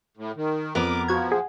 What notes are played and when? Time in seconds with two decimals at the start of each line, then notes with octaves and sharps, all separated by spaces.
0.17 A2
0.36 D#3
0.75 F2 B3 A#4 D6
1.08 F3 F#4 G#6
1.32 G#4 F#5